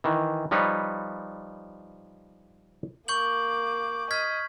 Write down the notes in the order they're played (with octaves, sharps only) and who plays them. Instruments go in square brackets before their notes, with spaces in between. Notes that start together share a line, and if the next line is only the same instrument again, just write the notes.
[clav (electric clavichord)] D#3 E3
F3 G3 D#4 B4 C#5
[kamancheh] A#3 D6 [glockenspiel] C#6 G6 F#7
[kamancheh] D#5 [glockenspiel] F6 G#6 B6